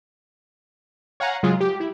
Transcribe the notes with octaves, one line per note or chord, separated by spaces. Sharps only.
C#5 F5 F#5 G#5 A#5
C#3 F#3 G#3 F4 G#4
G4
E4